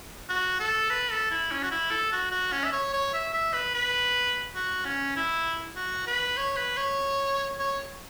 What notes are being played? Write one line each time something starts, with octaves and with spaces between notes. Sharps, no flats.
F#4
A4
B4
A4
E4
C#4
F#4
E4
A4
F#4
F#4
C#4
E5
C#5
C#5
E5
E5
B4
B4
F#4
C#4
E4
F#4
B4
C#5
B4
C#5
C#5